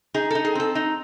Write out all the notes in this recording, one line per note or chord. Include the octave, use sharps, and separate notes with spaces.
D#4 G#4
D#4 A4
G#4
C4 A4
D#4